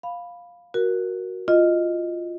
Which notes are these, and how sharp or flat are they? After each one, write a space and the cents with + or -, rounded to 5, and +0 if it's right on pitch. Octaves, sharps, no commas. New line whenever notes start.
F5 +5 B5 +0
F#4 +0 A#4 +10
F4 -5 D#5 +0